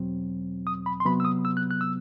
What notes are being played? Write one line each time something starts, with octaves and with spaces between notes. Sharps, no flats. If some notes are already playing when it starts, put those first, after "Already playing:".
Already playing: E2 B2 F#3 C4
D#6
B5
C6
C3 F#3 B3 B5
E6
D#6
E6
F#6
F#6
E6